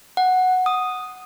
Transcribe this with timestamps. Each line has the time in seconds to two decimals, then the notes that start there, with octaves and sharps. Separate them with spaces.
0.17 F#5
0.66 D#6